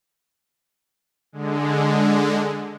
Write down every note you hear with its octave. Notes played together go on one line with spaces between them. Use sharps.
D3 G#3